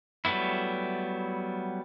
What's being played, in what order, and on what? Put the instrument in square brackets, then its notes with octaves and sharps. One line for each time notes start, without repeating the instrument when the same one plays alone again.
[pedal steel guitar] F#3 G3 A3 B3 E4